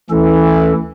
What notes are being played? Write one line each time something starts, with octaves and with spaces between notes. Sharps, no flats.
D2 E3 C#4 A4